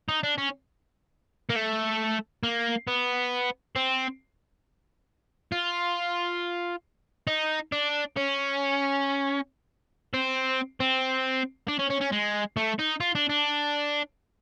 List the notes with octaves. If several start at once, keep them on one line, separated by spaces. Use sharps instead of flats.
D#4
D4
C#4
A#3
A3
A#3
B3
C4
F4
D#4
D4
C#4
C4
C4
D4
C#4
C#4
C#4
G#3
A3
D#4
F4
D4
D4